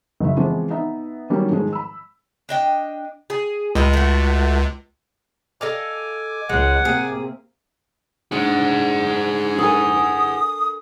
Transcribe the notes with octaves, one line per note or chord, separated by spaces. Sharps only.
F#1 C#3 E5
E3 F3 G#3 B3 C4
B3 D#4 E5
D#3 F#3 G3 A#3 B3 C#4
G#2 D#3 F3 G#3
B5 E6
D4 D#5 G5
G#4
C#2 A2 G3 D#5
A3 F#4
A4 D#5 F5 G#5 D6
C#2 G#3 F#5
C3 A#3 G#4
G#2 D4 G#4 F#5
A4 A#4 G#5 D#6